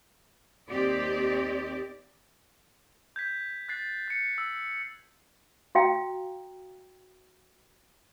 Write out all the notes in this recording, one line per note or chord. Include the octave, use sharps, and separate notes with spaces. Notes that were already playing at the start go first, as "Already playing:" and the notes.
D#2 C4 G4 D5 D#5
G6 G#6 B6
F#6 A6 C7
G6 C#7
E6
F#4 F5 G5 A#5